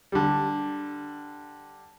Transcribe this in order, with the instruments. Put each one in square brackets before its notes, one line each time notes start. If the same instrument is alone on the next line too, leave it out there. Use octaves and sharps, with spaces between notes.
[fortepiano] D3 G3